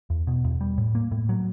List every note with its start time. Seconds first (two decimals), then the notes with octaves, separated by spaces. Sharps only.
0.10 E2
0.27 B2
0.44 E2
0.61 G3
0.78 A2
0.95 A#3
1.12 A2
1.29 F#3